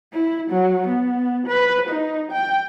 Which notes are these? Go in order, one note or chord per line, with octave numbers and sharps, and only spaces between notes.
E4
F#3
B3
B4
D#4
G5